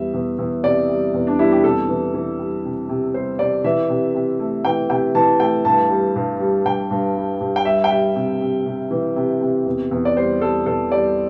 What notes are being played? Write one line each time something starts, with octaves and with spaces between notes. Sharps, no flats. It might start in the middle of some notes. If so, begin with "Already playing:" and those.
Already playing: E2 G3 E5
E2
E2
C3 D5
G3
E2
D4
G3 E4
G4
C3 A4
E3
E3
G3
C3
C3
G3 C5
C3 D5
E3 E5
C3
C3
A3
E3 G5
C3 G5
E3 A5
A3 G5
G2 A5
G3
G2
G3
G2 G5
G2
G3
G2
G5
G3 E5
G5
G3 E5
C3
C3
C3
E3
C3
C3
E2
E2
D5
G3 C5
G3 A4
E2 A4
G3 D5